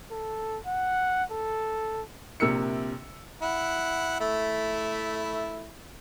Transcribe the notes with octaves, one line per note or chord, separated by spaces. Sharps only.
A4
F#5
A4
A#1 C3 A#4 E6 C#7
E4 F#5
A3 E4